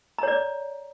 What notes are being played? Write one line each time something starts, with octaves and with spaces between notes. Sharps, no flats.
C#5 D5 A#5